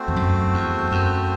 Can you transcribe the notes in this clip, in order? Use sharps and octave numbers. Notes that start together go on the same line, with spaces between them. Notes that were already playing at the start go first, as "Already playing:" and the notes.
Already playing: A3 C4 F#4 C5
E2
F#2
E2
F#2